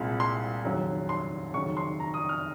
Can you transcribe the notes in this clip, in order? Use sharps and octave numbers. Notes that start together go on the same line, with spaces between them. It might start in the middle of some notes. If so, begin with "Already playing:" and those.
Already playing: C2 A#2 G#3 C4
C6
F1 D#2 C#3 F#3
C6
F1 D#2 C#3 F#3 C#4 C#6
C6
A#5
D#6
F6